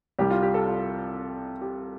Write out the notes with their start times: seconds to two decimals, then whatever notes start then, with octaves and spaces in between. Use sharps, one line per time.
0.19 C2 C3 G3 G4
0.30 F4
0.43 G4
0.54 A4
0.66 F4
1.61 G4